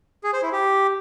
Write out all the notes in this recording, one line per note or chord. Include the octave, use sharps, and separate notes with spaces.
G#4
C5
E4
G4